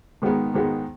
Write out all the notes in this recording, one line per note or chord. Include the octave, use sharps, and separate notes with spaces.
G#2 D#3 G#3 B3
G#2 D#3 G#3 B3